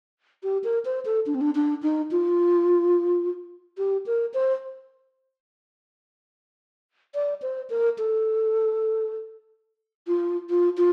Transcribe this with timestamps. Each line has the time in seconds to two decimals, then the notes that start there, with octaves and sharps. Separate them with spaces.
0.43 G4
0.64 A#4
0.85 C5
1.05 A4
1.26 D4
1.35 C4
1.41 D4
1.55 D4
1.82 D#4
2.11 F4
3.78 G4
4.06 A#4
4.34 C5
7.15 D5
7.42 C5
7.70 A#4
7.98 A4
10.08 F4
10.50 F4
10.77 F4